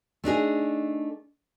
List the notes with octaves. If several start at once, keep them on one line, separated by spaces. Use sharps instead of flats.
A3 D4 D#4 G#4